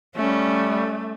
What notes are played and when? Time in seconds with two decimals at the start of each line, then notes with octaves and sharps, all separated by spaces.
0.16 G3 A3 C#4